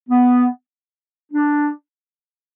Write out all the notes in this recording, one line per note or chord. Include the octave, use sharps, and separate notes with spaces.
B3
D4